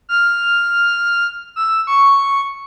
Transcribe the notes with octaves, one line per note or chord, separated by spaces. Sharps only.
F6
E6
C#6